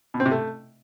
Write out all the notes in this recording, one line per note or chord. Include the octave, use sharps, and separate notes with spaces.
B2
C4
C3
A3